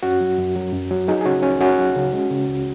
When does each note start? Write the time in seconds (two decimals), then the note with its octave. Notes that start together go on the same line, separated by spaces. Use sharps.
0.03 F#2 C#4 F#4
0.21 F#3
0.38 F#2
0.56 F#3
0.73 F#2
0.91 F#3
1.08 F#3 D#4 G#4
1.21 G#4
1.26 C#3 C#4 F#4
1.43 C#2 C#4
1.61 C#2 C#4 F#4
1.78 F#3
1.95 C#3
2.13 G#3
2.31 C#3
2.49 C#2